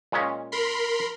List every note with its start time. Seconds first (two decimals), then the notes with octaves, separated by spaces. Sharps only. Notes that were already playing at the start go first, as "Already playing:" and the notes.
0.12 A#2 G#3 C#4
0.52 A#4 B5 C6